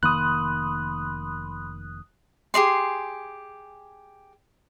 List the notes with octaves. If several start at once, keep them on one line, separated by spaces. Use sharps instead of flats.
F1 D#3 A#3 B5 C6 D#6 F#6
G4 G#4 D5 C6